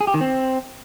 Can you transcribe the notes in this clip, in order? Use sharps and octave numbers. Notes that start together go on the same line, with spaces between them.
G#4
G4
D#3
C4